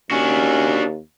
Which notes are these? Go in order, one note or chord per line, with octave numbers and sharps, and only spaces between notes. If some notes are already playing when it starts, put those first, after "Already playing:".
D#2 C#4 D4 F#4